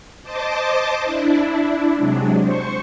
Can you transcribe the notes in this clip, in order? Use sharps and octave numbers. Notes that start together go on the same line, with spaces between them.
C5 D#5 A5 D6
D4 E4
C3 F#3 G#3 D4
C5 C#6 C#7